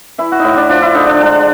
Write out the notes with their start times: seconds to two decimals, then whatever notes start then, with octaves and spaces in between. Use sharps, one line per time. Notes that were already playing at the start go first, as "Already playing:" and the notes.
0.18 E3 E4
0.32 F#4
0.39 A2 D#4 E4
0.57 D4
0.69 F3 D4
0.82 E4
0.95 D3 D#4
1.07 D4
1.20 G#3 D4